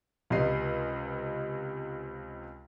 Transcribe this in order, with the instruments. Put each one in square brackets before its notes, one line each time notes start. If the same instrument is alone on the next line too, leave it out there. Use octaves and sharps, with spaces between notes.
[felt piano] C#2 C3 D#5 C7